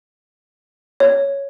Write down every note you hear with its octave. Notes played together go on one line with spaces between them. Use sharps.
C#5